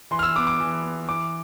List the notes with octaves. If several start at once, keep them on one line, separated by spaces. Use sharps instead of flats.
E3 C6
F6
E6
B3 D6
D6
E3
B3
E3 D6